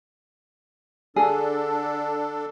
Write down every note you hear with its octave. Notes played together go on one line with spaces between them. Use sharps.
D3 D4 G#4 A4